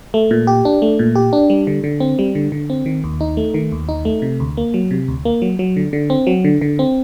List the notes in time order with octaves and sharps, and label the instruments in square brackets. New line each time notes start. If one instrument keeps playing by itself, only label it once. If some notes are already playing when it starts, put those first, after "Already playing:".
[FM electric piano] A3
A#2
G4
D4
A3
A#2
G4
D4
G3
D3
D3
C4
G3
D3
D3
C4
D#3
D#2
D#4
A3
D#3
D#2
D#4
A3
C3
D2
A#3
F#3
C3
D2
A#3
F#3
F#3
D3
D3
C4
F#3
D3
D3
C4